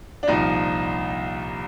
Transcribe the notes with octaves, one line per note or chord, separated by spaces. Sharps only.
D4
C2 A#2 F3 D#4